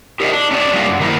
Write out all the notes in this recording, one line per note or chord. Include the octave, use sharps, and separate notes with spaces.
G4 A#4 C5 C#5 D#5 E5
D4
C#4 D4 E4 F#4 C#5 D5
F#3 G3 A3 A#3 F4
F#2
D#3 A#3 E4 G4 A#4 C5